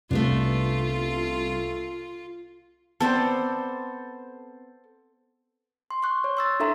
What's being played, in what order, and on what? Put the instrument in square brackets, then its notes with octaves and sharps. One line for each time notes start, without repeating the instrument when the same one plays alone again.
[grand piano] C2 [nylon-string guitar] A3 B3 D4 [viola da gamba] F4
[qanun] B3 C4 D5 [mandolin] A4 C5
[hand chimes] C6
C6 C#6 F#6
C#5
C6 E6 A6
D4 E4 A4 E5 A#5 C6